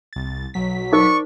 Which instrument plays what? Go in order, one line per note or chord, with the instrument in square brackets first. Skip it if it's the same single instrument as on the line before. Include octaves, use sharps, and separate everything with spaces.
[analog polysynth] C2 A6
B1 F#3 B6
[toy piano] D#4 A#4 C5 [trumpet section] D5 C#6